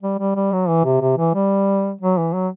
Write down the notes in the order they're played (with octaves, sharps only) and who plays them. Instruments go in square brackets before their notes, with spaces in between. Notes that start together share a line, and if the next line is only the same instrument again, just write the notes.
[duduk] G3
G3
G3
F#3
E3
C3
C3
E3
G3
F#3
E3
F#3